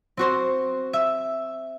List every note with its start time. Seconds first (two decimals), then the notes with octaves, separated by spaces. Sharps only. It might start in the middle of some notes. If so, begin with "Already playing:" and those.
0.17 C4 F#4 C5
0.93 E5